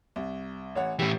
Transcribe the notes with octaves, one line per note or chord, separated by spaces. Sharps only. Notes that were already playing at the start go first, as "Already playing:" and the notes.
C2
A1 C#5 F#5
A2 E3 G4